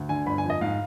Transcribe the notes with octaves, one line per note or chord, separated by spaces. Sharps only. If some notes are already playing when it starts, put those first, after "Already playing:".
Already playing: D2
D3 G#5
G1 B5
G#5
F2
D#5
G#2 F5